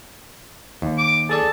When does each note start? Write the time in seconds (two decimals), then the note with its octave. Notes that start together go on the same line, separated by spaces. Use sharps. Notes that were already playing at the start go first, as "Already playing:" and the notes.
0.82 D#2
0.98 D6
1.29 G#4 A4 D5 A5